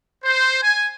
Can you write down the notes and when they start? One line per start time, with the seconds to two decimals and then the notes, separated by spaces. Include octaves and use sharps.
0.24 C5
0.62 G#5